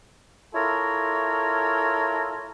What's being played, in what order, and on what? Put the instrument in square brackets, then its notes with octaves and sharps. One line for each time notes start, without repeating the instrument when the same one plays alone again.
[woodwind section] E4 F4 A4 A#4 C#5